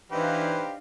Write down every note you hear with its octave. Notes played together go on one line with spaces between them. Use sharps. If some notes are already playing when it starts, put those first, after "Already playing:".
E3 D4 D#4 G4 B4 C5 F5